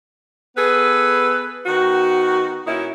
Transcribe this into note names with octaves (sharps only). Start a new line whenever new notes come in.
B3 G#4 A4 B4
D#3 B3 F#4
A#2 C#4 D#4 E4 F#4